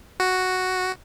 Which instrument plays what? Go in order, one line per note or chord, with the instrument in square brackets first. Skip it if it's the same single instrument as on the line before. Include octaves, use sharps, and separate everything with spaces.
[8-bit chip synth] F#4